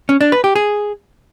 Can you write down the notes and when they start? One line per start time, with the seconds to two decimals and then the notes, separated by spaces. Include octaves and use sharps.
0.09 C#4
0.21 D4
0.32 B4
0.44 G4
0.56 G#4